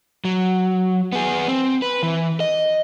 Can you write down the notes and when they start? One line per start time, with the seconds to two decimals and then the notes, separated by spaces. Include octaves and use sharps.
0.25 F#3
1.12 B3 G#4
1.48 C4
1.82 B4
2.03 E3
2.40 D#5